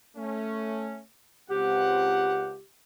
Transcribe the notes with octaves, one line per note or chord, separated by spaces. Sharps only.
A3 C#4
C#2 C4 G4 F#5